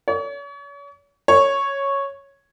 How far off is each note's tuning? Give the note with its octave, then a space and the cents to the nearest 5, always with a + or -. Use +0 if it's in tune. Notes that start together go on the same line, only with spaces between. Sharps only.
C#5 +40
C#5 -5